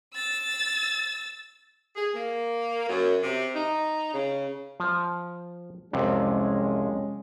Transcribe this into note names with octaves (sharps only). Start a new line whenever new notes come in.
E6 A6
G#4
A#3
F#2
C3
D#4
C#3
F3
C2 F2 C3 G#3 C#4